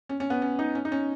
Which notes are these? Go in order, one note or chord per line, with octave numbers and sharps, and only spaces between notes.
C#4
C#4
B3
C#4
D#4
C#4
D#4
C#4